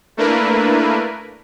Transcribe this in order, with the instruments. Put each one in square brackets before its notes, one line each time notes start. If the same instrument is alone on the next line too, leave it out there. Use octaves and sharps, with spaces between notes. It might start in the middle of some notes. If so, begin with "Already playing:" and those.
[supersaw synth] A3 A#3 D4 E4 A#4 B4